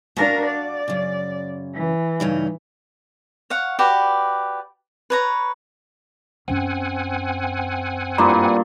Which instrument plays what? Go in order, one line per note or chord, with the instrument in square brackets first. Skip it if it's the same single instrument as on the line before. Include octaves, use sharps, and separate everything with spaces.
[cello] D4 A#4 [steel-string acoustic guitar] F#4 F5
[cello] D5
[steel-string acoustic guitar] F#2 C#3
[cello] E3
[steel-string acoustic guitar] G2 C#3 D#4
[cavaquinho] C#5 F5 F#5
F#4 G4 B4 D5
B4 C#5 A#5
[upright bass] F#2 C#4 [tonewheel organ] C4 F#5 G#5
[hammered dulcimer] G2 A#2 [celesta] A#5 C6 D6